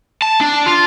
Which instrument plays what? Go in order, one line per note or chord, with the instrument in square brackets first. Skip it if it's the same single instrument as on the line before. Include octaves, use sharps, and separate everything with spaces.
[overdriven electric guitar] A5
D4
F4